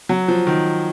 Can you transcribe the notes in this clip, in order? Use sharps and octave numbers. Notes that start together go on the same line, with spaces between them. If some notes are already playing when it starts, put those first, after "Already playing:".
F#3
F3
D#3